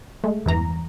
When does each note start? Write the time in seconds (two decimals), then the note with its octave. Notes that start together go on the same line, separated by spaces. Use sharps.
0.24 G#3 A3
0.46 E2 G2 E3 A#5